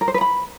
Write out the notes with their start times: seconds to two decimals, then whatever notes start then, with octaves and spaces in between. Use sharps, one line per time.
0.01 A#4
0.08 C5
0.14 B4
0.21 B5